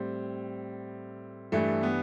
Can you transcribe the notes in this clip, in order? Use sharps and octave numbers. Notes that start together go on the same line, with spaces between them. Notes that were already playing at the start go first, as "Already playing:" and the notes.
Already playing: A2 G3 C4
G2 E3 G3 A3
B3